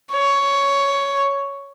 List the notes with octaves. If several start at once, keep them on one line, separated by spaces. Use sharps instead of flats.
C#5